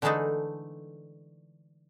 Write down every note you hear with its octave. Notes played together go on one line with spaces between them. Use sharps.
D3 E3 G#3 A3 D4 D#4